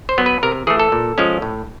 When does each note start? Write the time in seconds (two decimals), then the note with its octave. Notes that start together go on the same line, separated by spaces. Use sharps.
0.09 C5
0.18 F#3 B3
0.26 B4
0.43 C3 A#4
0.67 E3 A3 G#4
0.80 A4
0.92 A#2
1.18 F3 G#3 C#4
1.42 A2